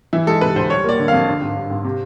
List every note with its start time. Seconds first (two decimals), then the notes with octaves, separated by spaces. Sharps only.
0.13 E3 E4
0.27 G#3 A4
0.41 C3 B4
0.56 D2 C5
0.70 G3 C#5
0.84 A#3 D5
0.99 D3
1.08 F2 F5
1.27 D3
1.41 G#1
1.56 G2
1.70 G#1
1.84 C3